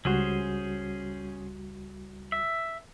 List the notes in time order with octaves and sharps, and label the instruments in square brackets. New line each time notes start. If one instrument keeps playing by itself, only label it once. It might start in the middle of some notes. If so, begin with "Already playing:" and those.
[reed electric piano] C#2 G3 F#4 [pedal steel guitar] C#4 G#4 C5
[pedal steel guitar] E5